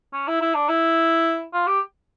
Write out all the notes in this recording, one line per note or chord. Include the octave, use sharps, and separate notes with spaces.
C#4
E4
E4
D4
E4
F4
G4